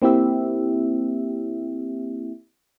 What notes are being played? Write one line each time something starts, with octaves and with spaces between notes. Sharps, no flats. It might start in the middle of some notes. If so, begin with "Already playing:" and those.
A#3 C4 E4 G4 E5